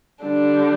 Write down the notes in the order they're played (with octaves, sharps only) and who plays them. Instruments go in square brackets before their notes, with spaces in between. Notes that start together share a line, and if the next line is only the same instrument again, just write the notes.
[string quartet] D3 G3 D4